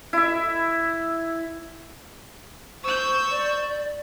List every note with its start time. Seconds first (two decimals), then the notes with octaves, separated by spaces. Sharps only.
0.13 E4 E5
2.84 C5 C#6 E6 G6
3.30 D5